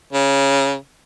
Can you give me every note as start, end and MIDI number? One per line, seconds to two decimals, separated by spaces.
0.13 0.75 49